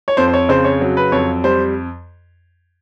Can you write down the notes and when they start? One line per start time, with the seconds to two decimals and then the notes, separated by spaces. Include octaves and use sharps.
0.08 C#5
0.17 F2 C5
0.28 C5
0.34 C#5
0.49 C#3 C5
0.65 C#5
0.81 F#3
0.97 B4
1.12 F2 C#5
1.44 G3 C5